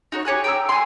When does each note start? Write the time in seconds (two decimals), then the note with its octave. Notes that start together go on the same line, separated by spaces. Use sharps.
0.12 D#4 F#4 C#5
0.25 G4 C#5 G#5 F#6
0.44 G5 A#5 D#6 E6
0.69 G#5 A#5 C6